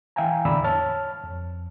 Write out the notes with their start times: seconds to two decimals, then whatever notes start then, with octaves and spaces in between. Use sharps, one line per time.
0.16 E3 E5 F5 G5 G#5 A#5
0.45 E2 A2 D3 D5 B5 E6
0.64 C#5 A5 F6
1.24 F2